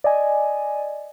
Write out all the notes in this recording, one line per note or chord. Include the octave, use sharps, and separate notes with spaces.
D5 D#5 G#5